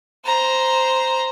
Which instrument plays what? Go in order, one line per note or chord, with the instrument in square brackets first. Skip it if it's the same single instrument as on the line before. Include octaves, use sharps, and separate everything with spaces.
[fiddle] C5 A#5